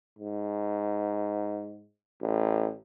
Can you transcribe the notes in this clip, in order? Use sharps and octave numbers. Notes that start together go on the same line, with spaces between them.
G#2
A1